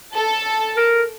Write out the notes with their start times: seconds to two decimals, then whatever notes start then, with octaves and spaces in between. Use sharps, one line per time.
0.13 A4 A5
0.77 A#4